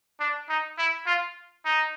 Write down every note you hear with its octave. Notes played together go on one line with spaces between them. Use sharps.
D4
D#4
E4
F4
D#4